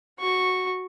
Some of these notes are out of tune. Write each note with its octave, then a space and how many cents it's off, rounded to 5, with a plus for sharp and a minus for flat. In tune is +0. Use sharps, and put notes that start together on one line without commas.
F#4 +0 C#6 -5